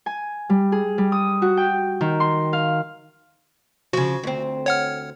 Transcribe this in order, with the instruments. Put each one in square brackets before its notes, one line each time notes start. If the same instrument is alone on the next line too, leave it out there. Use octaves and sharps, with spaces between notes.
[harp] G#5
G3
G#4
G3
D#6
F#4
G5
D#3
C6
F5
[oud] C#3 F3 [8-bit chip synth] F#4
[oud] D2 C4
[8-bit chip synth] C#5 F#5 F6